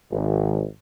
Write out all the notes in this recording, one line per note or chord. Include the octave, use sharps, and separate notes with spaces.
G#1